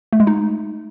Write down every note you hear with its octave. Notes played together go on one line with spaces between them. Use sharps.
A3
G#3
D#4